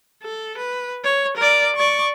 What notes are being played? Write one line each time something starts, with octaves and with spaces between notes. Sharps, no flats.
A4
B4
C#5
A#4 D5
D5 C#6